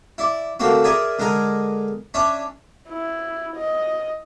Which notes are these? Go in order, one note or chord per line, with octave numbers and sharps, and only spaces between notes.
E4 D5
D3 A3 A#3 C4 F#4
G#4 A#4 D5 E5 G#5
D3 G#3 D#4 A#4 G#5
C#4 D4 C#5 E5
E4
D#5